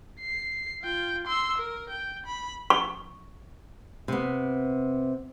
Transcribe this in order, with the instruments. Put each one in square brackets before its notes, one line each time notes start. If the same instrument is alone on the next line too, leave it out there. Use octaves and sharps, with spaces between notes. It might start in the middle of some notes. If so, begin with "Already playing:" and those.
[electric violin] C7
F4 G5
C6 E6
A#4
G5
B5
[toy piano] C#6
[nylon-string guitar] C3 B3